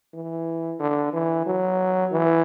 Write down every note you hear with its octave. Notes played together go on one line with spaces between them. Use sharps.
E3
D3
E3
F#3
E3